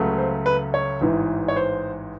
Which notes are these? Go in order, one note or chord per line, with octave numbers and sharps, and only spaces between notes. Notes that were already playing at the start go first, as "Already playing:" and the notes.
Already playing: C#2 C#3 F#3 A3
C5
B4
C#5
A1 G#2 E3
C#5
C5